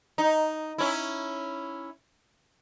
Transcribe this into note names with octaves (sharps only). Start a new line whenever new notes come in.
D#4
C#4 E4